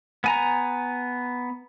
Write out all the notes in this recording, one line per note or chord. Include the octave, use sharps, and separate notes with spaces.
B3 G#5 A#5